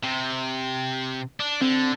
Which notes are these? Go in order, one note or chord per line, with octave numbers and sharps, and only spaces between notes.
C3
D4
D3 C4